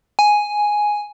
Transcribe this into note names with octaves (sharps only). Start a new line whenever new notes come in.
G#5